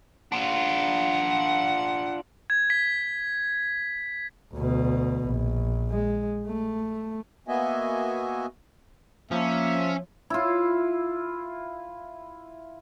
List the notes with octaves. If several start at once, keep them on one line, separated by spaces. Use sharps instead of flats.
D4 F4 F#5
G#6
B6
D2 B2
A#1
G#3
A3
A#3 B3 F#4 D#5 E5 G#5
F3 A#3 C#4 E5
E4 F4